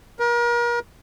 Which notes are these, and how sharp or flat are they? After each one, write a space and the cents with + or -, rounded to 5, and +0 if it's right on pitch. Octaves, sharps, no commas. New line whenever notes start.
A#4 +35